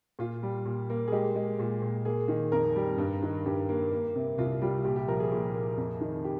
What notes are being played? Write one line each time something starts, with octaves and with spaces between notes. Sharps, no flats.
A#2 F4
G3
A#2
A#3
G#4
G#3 G4
G#3
A#2
A#2
A#3 G#4
D#3
F2 A#4
G3
G2
D#3
G2 G4
A#3
A#3
C3
C2 F4
G3 F4
A#2 G4
G4
F3 A#4
G#4
A#2
A#3
F2
D#3
G4